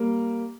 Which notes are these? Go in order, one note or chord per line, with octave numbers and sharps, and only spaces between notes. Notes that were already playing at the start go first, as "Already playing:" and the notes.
Already playing: G3 A#3